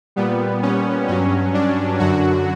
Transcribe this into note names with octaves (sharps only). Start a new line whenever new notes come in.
A#2 G3 B3
C#4
G2 F#3 C#4
D4
F#2 D3 F#3 F#4